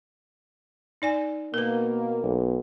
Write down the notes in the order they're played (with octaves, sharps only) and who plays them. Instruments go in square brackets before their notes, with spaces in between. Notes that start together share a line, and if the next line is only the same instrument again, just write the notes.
[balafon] D#4 D5 G#5
[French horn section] B2 A#3 [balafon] A#4 B4
[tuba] B1